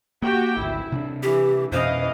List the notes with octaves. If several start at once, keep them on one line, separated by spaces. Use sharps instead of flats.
A#3 F#4 G4 G5
G#1 D2 E4
C3 C#4 D4
E3 G4
F2 B2 E3 C#4 C5 D#5 F5